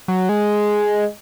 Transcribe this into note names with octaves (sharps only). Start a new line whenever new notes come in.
F#3
G#3